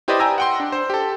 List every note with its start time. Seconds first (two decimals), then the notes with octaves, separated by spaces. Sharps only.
0.08 E4 G4 B4 C5 D5 D#5
0.19 G5 G#5 A#5 E6 A#6
0.38 F#5 G5 C6
0.60 D4
0.72 C5
0.90 G4 A4